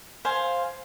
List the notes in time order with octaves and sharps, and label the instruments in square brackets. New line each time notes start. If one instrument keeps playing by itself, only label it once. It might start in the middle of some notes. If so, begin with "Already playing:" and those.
[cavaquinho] C5 F5 G#5